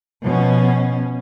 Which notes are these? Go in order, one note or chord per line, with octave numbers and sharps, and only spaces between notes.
B2 F3 C#4